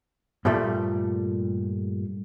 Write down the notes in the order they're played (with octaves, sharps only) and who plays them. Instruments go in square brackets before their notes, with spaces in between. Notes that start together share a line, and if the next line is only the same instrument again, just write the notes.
[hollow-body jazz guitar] G2 A#2 F3 G3 A3